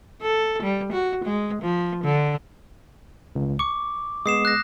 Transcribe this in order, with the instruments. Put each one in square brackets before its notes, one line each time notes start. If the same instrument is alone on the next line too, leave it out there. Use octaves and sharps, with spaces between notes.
[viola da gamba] A4
G3
F#4
G#3
F3
D3
[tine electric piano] C#2
[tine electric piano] C#6 [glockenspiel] D6
[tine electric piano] G#3 B3 [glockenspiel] D#6 C7 E7
[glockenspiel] F#6 A#6